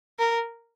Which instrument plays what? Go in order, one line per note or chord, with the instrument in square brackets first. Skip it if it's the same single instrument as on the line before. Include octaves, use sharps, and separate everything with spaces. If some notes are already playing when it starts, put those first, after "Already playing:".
[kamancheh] A#4